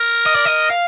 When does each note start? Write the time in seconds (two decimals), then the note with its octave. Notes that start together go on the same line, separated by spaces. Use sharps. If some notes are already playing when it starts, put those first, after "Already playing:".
Already playing: A#4
0.26 D#5
0.35 D5
0.45 D#5
0.70 F5